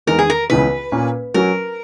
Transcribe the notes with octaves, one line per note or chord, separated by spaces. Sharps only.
E2 D#3 G#3 B3 D#4 A#4
G#4
A#4
C#2 C#3 E3 B3 B4
A#2 A#3 C#4
F#3 C#4 F#4 A#4